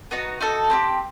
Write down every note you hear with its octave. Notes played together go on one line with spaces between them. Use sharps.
B3 D#4 F#4
D#4 F#4 A4
C4 E4 G4